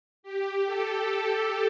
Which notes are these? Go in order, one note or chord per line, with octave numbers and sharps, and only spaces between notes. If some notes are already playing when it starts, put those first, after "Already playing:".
G4
A4